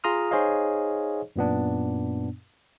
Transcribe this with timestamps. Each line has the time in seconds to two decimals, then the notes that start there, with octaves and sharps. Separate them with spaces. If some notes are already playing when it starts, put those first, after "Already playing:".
0.04 F4 G#4 A#5 C6 D#6 F6
0.31 D#4 G#4 C5 C#5 D#5 F5
1.36 F#2 A#2 B3 D4